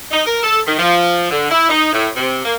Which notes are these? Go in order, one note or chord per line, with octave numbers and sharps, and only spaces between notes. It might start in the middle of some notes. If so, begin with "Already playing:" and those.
D#4
A#4
A4
D#3
F3
D3
E4
D#4
A2
C3
A#3